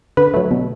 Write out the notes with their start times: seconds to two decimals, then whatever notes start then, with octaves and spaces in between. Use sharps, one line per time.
0.17 D3 B4
0.34 F#3 A3
0.51 B2